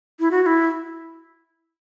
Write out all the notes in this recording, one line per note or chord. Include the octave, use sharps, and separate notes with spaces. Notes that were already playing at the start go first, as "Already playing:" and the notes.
E4
F#4
F#4
E4